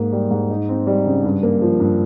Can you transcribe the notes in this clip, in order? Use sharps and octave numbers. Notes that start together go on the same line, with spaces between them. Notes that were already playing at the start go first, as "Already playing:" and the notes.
Already playing: G#2 A#3
G3
G#2
D#4
C4
G3
C#3
G2
A#3
F3
G2